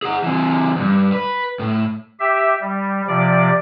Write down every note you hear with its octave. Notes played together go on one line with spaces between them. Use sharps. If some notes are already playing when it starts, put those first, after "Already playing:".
G#4 F#5
E3 C4
E2 G2
B4
A2
G4 E5
G3
C3 F3 D5